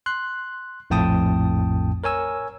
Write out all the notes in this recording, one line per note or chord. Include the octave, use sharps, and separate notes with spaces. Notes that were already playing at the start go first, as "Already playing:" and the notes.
C6 F#6
A#1 F2 A2 G5 A5 D#6
A#4 C#5 G#5 E6